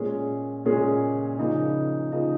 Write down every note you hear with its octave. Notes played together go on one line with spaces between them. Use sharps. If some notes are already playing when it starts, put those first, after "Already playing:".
Already playing: A#2 G#3 C#4 G#4
A#2 G#3 C#4 G#4
C#3 F3 A#3 D#4
C#3 F3 A#3 D#4